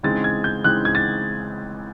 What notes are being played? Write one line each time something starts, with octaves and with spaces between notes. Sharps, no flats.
C#3 E3 G#3 C4 D#4 A6
G#6
G6
C#3 E3 G#3 C4 D#4 F#6
G#6
A6